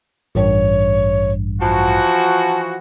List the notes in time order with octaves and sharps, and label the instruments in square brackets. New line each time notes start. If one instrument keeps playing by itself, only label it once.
[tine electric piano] A1 G2 [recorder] C#5
[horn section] E3 F3 F#4 [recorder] A5